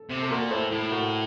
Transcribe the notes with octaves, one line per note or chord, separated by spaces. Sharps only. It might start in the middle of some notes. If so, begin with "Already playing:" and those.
Already playing: A4
C3
A4
A#2 F#4 A#4
A2 A4 C5
A2
F#4 A#4